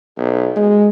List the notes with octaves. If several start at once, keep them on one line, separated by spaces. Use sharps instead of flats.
B1
G#3